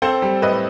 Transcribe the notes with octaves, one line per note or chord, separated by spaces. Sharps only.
C4 A4 C5
G3
A2 B4 D#5